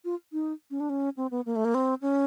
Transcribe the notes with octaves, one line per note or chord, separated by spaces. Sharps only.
F4
D#4
C#4
D4
C#4
C4
B3
A#3
A3
A#3
C4
C#4